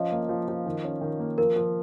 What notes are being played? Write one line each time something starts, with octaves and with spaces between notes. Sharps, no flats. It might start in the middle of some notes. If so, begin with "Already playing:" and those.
Already playing: F3 C#4 D#5 F5
A#3
F3
F3
D#3
C#4
D#3
A#3
F3 A#4
F3